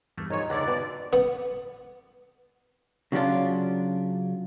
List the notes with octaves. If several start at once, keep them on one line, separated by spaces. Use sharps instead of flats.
E2 G2 A3 A#3
A#1 G#2 D#4 C#5
C#2 A#2 D3 D5 F#5 D6
G2 B2 B3
B3
C#3 F#3 C#4 D4 F4